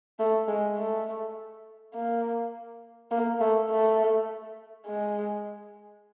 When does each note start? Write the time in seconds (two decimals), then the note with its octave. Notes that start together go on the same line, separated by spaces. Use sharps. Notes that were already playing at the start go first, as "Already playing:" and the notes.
0.19 A3
0.48 G#3
0.77 A3
1.94 A#3
3.11 A#3
3.40 A3
3.70 A3
4.87 G#3